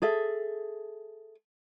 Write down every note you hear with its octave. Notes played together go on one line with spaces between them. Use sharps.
G#4 A4 E5